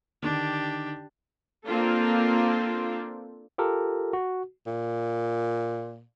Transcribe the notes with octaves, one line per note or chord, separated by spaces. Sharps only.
D3 D#3 D4 G4
A#3 C4 D4 F4 A4
F4 G4 A4 A#4
F#4
A#2